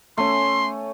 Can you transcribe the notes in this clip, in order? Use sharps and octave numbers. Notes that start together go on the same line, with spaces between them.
A3 C#4 C6